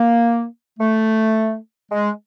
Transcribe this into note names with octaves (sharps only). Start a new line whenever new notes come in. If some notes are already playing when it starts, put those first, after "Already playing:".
Already playing: A#3
A3
G#3